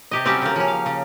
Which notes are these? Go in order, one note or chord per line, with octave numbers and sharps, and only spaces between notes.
C3 G4 D#5
F#3 G3 C4 C#4 G4 A5
C#3 A#3
F3 C#4
F5
C#3